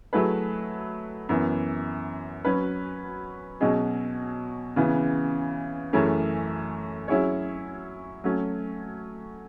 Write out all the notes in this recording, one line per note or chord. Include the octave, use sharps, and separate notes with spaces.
F#3 A3 E4 G#4 B4
F#2 E3 B3
F#3 C#4 F#4 B4
B2 F#3 C#4 G#4 D#5
C#3 E3 B3
F#2 E3 A3 C#4 G#4
F#3 C#4 E4 G#4 C#5
F#3 A3 C#4